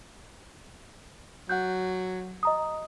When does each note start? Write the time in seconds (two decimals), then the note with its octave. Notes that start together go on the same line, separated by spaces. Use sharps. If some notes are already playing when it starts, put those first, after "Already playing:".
1.49 F#3 F#5 F#6 G6
2.43 D#5 A#5 D#6